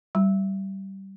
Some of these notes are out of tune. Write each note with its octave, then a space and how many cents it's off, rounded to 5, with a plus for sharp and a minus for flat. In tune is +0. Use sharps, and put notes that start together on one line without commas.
G3 -20